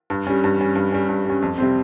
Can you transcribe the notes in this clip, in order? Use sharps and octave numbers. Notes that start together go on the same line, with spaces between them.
G2
G3 C#4
G2
G3 C#4
G2
G3 C#4
G2
G3 C#4
F2
C3 G3 C4